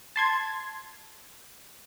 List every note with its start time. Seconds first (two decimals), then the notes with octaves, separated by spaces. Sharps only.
0.16 A5 C6 G#6